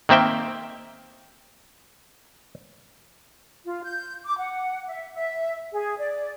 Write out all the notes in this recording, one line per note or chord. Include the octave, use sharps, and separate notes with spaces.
D#3 A#3 C4 E5 G5
F4
G6
D6
F#5
E5
E5
G#4
D5